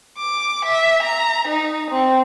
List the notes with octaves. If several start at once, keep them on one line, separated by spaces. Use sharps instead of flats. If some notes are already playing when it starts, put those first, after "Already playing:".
D6
E5
A#5
D#4
C4